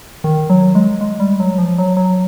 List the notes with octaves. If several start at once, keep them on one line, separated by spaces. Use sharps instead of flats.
D#3
F#3
G#3
G#3
G3
F#3
F3
F#3
F#3